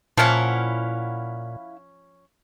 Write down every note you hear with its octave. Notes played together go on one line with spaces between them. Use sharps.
A#2 F3 C#4 E4 F5 F#5